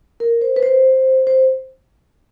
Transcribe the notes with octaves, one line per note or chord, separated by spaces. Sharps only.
A#4
C5
B4
C5
C5